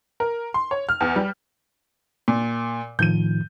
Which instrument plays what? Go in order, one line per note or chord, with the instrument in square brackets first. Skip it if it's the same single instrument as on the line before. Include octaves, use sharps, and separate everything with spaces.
[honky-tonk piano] A#4
C6
C#5
F6
E2
G3
[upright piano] A#2
[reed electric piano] A2 D#3 F3 [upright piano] G6 D#7